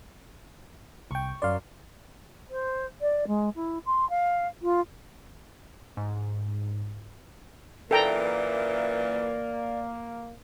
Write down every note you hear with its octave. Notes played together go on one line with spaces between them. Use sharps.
C2 G5 C#6
F#2 D5 F5 C6
C5
D5
G#3
E4
C6
F5
F4
G#2
F#2 A#2 E3 A#3 A4 D5 G5 A#5